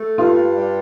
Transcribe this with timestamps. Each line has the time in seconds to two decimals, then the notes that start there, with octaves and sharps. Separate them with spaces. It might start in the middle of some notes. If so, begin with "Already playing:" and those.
Already playing: A3
0.18 G2 F4
0.55 G3